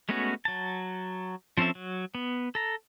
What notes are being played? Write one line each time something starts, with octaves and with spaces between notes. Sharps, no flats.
G#3 A3 B3 C#4 F#4
F#3 A5
F3 C4 C#4 A4 E5
F#3
B3
A4 A#5